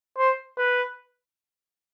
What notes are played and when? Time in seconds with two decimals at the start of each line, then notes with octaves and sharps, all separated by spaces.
0.18 C5
0.58 B4